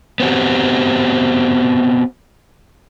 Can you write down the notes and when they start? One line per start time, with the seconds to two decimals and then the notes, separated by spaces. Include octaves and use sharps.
0.20 B3 C4 F#4 G4